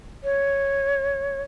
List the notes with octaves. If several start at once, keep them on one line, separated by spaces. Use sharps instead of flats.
C#5